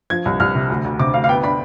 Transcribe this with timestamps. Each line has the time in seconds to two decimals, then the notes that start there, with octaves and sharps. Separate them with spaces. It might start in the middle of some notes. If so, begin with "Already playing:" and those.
0.10 F3 G#6
0.25 C2
0.40 C2 F6
0.55 C3
0.70 D2
0.85 D2
0.99 C3 D6
1.14 D2 F5
1.24 F5
1.29 B3 G5
1.43 D4 B5